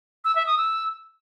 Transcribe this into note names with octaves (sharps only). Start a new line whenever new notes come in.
E6
E5
D#6
E6